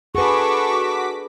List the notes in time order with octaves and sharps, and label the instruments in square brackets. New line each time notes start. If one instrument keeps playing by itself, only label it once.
[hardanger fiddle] D4 A4 [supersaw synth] F#4 D6 B6 [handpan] G#4 B4 [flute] C#6